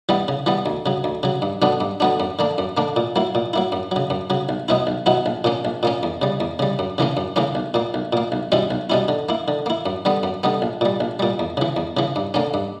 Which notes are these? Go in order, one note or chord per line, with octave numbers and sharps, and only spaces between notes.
E3 G3 B3
C#3
E3 G3 B3
D2
C#3 F#3
D2
C#3 F#3
G2
D3 F#3 B3 D4
G2
D3 F#3 B3 D4
F#2
D3 A#3 D4
F#2
D3 A#3 D4
A#2
F#3 A#3 E4
A#2
F#3 A#3 E4
F#2
C#3 F#3
F#2
C#3 F#3
B1
B2 F#3 B3 E4
B1
B2 F#3 B3 E4
A#1
A#2 A#3 C#4
A#1
A#2 A#3 C#4
E2
C#3 G3
E2
C#3 G3
F#2
C#3 E3 A#3 C#4
F#2
C#3 E3 A#3 C#4
B1
A#2 A#3
B1
A#2 A#3
B1
B2 G3 C#4 E4
B1
B2 G3 C#4 E4
D3
A#3 E4
D3
A#3 E4
F#2
D3 G3 B3
F#2
D3 G3 B3
A#1
A#2 G3
A#1
A#2 G3
E2
C#3 E3
E2
C#3 E3
G2
D3 A#3 C#4
G2